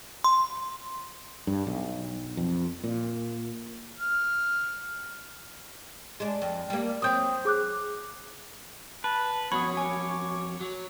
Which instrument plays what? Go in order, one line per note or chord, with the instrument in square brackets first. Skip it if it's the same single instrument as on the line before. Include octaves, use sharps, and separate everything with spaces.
[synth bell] C6
[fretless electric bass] G2
B1
F2
A#2
[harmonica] F6
[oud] G#3 D4
F2
G3 A#3
[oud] F#3 C4 [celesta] D#6 G6
[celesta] G#4 D6 F#6
[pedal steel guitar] B4 [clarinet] A5
[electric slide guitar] F2 F#3 [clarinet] B3 [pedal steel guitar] C#5 [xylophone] B5 D#6
[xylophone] G#5 [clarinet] D6
[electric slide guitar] F#3